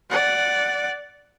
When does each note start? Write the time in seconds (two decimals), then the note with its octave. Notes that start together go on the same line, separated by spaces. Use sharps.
0.10 D5 F#5